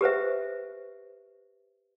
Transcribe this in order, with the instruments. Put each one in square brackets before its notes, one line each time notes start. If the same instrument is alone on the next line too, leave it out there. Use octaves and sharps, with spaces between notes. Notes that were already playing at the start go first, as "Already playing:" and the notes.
[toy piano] G4 B4 C5 E5